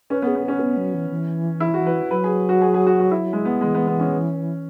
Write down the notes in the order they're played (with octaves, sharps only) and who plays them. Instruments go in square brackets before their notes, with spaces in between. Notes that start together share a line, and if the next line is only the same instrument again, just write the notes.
[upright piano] C#4 [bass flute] B4
[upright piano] B3 [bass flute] B4
[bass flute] G#4
[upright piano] B3
[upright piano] C#4 [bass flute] B4
[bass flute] B3
F#3
E3
E3
[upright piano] E4
F#4
B4
[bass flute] F#3 [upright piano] B4
[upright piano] G#4
F#4
G#4
G#4
F#4
F#4
E4
G#3
B3
[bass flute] E3 [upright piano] G#3
[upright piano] B3
B3
C#4